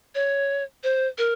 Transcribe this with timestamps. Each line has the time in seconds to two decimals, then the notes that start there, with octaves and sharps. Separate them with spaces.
0.15 C#5
0.84 C5
1.18 A#4